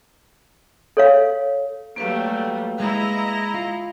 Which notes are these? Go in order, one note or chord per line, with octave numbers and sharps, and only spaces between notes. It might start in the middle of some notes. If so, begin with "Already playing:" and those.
A4 C#5 F5
F#3 G3 A3 A#3 B4 F5
G#3 E4 D#5 A#5
F4